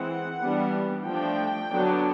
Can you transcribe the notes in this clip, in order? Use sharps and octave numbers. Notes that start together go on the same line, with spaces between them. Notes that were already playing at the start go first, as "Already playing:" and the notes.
Already playing: E3 G#3 C4 F#5
E3 G3 B3 D4
F3 A3 D4 G5
D3 F#3 B3 D4